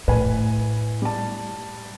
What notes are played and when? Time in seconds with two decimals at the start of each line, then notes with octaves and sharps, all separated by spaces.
0.08 A2 B4 G#5
1.02 G3 A5